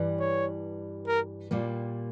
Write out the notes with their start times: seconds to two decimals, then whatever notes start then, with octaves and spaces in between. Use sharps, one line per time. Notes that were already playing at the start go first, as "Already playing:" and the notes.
Already playing: G2 E3 G3
0.20 C#5
1.07 A#4
1.51 A#2 G3 A#3